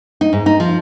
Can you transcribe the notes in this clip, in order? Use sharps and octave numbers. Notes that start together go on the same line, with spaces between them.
D#4
G#2
D#4
F3